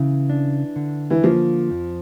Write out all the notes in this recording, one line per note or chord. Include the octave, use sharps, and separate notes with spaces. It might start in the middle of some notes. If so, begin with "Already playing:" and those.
Already playing: C#3 E3
D4
D3
E3
F3 A#3
F2